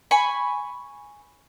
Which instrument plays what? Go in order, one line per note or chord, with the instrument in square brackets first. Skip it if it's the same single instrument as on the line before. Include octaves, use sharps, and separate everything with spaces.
[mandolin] G#5 B5 C#6